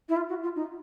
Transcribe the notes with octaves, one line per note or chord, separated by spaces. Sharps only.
E4
F4
F#4
F4
D#4